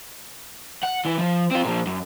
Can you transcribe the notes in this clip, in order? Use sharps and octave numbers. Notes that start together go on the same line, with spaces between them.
F#5
E3
F3
C4 F4
A#2 F3
F#2